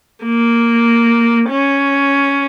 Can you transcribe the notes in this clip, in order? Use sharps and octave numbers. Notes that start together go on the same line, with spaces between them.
A#3
C#4